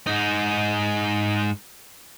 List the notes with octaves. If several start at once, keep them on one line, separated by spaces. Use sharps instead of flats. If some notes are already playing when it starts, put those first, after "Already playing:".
G#2 D#4